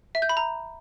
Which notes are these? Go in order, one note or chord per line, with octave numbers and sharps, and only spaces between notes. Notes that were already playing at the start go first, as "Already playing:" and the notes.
E5
G6
B5
A#5